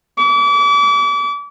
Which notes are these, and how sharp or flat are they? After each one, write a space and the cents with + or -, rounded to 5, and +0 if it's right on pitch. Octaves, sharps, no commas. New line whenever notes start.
D6 -35